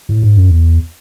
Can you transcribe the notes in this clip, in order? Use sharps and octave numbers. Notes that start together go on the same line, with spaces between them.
A2
G#2
F#2
E2